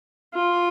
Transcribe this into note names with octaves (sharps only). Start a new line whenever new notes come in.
F4